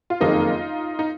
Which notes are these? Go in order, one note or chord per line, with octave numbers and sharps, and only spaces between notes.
F4
F#1 F2 D#3 A#3 D#4
D#4